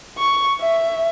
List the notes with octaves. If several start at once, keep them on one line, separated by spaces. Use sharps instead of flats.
C#6
E5